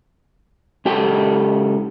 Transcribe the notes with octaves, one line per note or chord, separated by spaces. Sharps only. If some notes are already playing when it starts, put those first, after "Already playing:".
C#2 G4 A4 G5